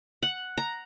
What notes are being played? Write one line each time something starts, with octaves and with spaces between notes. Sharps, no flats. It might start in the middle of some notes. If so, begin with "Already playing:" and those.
F#5
A#5